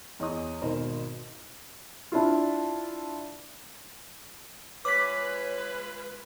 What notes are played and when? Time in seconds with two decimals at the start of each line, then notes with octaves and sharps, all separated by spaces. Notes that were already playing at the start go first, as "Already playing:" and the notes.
0.19 E2 C#5 D#5 D#6
0.61 G#1 B2 D#3 A#4 C5 D#5
2.12 D4 E4 F4
4.85 G#3 F4 B4 C#5 D6 B6